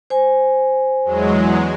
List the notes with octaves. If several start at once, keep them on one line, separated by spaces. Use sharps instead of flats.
C5 G#5
E2 F#3 G#3